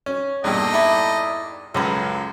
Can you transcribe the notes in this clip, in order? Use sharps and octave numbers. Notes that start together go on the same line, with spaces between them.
C#4
E2 G2 A#2 A4 D#5 G5
D#4 E4 D5
C#2 F#2 F4 A4 B4